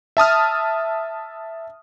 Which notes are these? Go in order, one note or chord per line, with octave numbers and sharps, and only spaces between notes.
E5 A5 D#6 F6